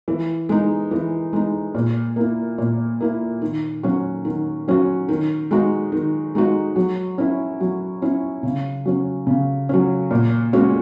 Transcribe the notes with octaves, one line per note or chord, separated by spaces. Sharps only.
E3
G#3 D#4
E3
G#3 D#4
A#2
A#3 E4
A#2
A#3 E4
D#3
F#3 C#4 F#4
D#3
F#3 C#4 F#4
D#3
G#3 D#4 F#4
D#3
G#3 D#4 F#4
F#3
C#4 E4
F#3
C#4 E4
C#3
F#3 C#4
C#3
F#3 C#4
A#2
G#3 C#4 F#4